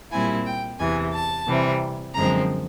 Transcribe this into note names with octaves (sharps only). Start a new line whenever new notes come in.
A#2 G3 C4 E4 G#5
G5
E2 C3 E3 G#5
A5
C3 E3 G3 C4
F#2 D3 F3 G#3 C4 A#5